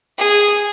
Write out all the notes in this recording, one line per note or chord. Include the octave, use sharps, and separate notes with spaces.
G#4